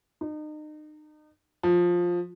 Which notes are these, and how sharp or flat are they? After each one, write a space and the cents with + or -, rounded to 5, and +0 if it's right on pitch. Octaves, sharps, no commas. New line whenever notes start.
D#4 -35
F3 +10